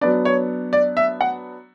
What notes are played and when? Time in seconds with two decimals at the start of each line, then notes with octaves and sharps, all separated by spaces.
0.01 F#3 B3 D4 D5
0.25 C#5
0.73 D5
0.97 E5
1.21 F#5